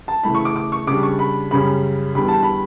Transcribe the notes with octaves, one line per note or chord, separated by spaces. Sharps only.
A5
C#3 E3 A3 B5
C#6
D6
D6
C#6
C#3 G3 D4 D6
C#6
B5
F#2 C#3 G3 C#4 B5
E2 D3 G3 B5
A5
B5